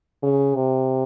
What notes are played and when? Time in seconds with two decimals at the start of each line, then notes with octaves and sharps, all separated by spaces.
0.23 C#3
0.55 C3